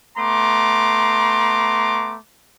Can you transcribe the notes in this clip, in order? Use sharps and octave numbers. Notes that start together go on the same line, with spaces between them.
A3 B3 A#5 C6 D6